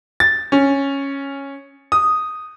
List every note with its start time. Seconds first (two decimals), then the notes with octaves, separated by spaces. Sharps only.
0.20 A6
0.52 C#4
1.92 D#6